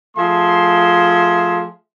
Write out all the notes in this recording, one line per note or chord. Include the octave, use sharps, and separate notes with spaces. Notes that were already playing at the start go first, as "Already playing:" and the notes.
F3 A3 G#4 E5 C6